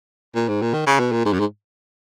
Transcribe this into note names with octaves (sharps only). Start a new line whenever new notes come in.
A#2
G#2
A#2
D#3
C#3
B2
A#2
G#2
F#2
G#2